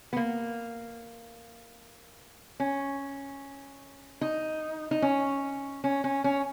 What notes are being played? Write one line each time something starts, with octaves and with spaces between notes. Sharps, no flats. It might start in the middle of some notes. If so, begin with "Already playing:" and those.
B3
A#3
C#4
D#4
D#4
C#4
C#4
C#4
C#4